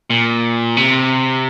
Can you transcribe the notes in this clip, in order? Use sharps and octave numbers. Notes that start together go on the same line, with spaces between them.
A#2
C3